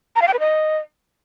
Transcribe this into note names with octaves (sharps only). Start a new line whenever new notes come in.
A#5
F5
G5
B4
D#5